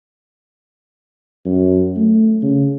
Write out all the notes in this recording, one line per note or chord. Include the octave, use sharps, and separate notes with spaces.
F#2
A3
C#3